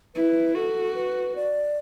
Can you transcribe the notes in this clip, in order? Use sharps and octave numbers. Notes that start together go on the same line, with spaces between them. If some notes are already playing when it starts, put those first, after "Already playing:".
E4 B4
F#4 A4
B4
D5